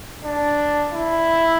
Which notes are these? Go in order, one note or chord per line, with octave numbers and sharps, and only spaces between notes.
D4
E4